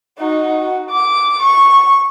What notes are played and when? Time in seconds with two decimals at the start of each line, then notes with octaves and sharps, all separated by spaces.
0.19 D#4 F#4
0.60 F#4
0.90 D6
1.42 C#6